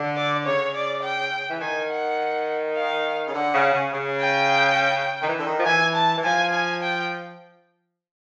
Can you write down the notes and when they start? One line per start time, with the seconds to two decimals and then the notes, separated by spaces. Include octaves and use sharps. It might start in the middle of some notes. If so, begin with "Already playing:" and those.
Already playing: D3
0.16 D5
0.46 C#3 C#5
0.75 D5
1.03 G5
1.51 E3
1.61 D#3 G#5
1.90 F#5
2.77 F5
3.28 C#3
3.34 D3 F#5
3.54 C#3
3.73 C#3
3.93 C#3
4.21 G5
5.22 D#3
5.28 E3
5.39 D3
5.47 D#3
5.58 F3
5.66 E3 G#5
5.95 A5
6.17 E3
6.24 F3 G#5
6.53 G#5
6.82 G5